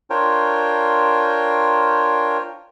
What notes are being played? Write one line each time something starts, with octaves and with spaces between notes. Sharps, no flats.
D4 F4 A#4 C5 C#5 G5